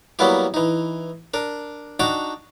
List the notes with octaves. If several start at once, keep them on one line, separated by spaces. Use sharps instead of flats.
F#3 G3 A#3 B3 E4 G4
E3 D#4
D4 A#4
D4 D#4 F#4 G5 A5 A#5